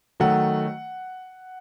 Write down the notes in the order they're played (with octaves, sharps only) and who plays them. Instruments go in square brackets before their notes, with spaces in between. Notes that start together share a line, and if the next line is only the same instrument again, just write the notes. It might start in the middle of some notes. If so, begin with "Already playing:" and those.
[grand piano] D#3 F#3 A3 F#5